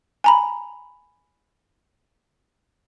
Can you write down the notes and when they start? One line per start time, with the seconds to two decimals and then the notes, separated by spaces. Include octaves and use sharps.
0.24 G#5 A#5 B5